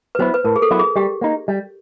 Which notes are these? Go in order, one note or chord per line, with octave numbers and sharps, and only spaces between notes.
B4
F#3 B3 E4 C5
B4
A2 A#4
G#4
A4
F#3 B3 E4
G#4
G3 G4
A#3 D#4
G3